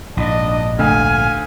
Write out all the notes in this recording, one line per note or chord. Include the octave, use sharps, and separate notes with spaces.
A#1 G#2 D4 D#5
D2 F5 G#5